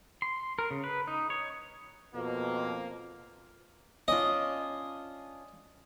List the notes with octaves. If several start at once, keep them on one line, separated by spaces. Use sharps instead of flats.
C6
A#4
C#3
B4
D#4
C#5
F2 B2 A#3
C#4 D4 F4 D#5